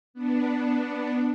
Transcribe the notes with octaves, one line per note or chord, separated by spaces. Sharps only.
B3 D4